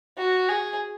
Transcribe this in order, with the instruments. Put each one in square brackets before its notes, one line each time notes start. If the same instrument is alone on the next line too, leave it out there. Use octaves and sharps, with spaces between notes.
[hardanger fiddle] F#4
G#4